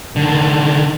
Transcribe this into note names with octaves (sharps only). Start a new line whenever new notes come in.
D3 D#3